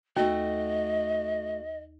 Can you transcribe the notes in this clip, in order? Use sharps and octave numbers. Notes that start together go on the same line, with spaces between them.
D#2 A3 F#4 D#5